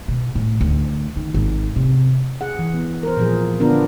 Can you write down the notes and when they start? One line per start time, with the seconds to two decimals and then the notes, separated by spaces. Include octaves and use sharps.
0.08 B2
0.35 A2
0.61 D2
1.16 D#3
1.34 G#1
1.76 C3
2.41 G#4 F#5
2.59 E3
2.74 B3
3.03 A#4 C5
3.17 A#2 F3 G#4
3.60 D3 B3 D4 F4 A#4